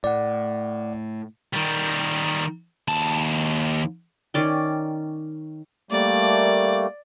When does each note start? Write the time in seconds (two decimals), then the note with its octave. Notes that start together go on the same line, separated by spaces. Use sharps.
0.04 A2 D5 F#5
1.53 D#3 G3
2.88 D#2 A5
4.34 D#3 C#4 D5 G5
5.91 G3 A3 A#3 D5